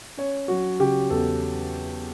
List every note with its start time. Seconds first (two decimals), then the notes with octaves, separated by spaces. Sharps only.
0.17 C#4 C#5
0.48 F#3 F#4
0.80 C#3 G4
1.10 E2 A4